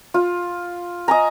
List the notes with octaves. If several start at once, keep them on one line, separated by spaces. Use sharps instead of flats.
F4
D#5 G#5 A#5